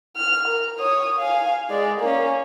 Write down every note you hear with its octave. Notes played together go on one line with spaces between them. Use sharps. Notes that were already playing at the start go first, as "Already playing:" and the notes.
F6
A#4
C#5 D#6
F5 G#5
G#3 D5
A#3 C#4